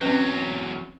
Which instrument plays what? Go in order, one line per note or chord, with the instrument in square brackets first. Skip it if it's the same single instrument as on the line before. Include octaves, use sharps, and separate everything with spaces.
[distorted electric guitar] E2 F#3 [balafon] C4 C#4 B4